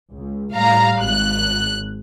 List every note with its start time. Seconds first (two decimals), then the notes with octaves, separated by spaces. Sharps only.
0.15 C#2
0.54 A2 G3 F5 A#5
1.01 G#1 F#6